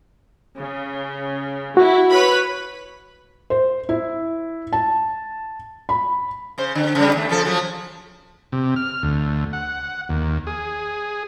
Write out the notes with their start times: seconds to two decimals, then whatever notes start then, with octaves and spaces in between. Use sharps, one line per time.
0.57 C#3
1.77 E4 F#4
2.11 B4 C#5 B5
3.50 C5
3.89 E4
4.73 A5
5.89 B5
6.58 C#3 C5
6.75 D3
6.95 C#3 G3
7.14 D#2 A3
7.29 C#3 F3 A4
7.45 F3 F#3
8.52 C3
8.76 F6
9.03 D2
9.53 F#5
10.09 D#2
10.47 G#4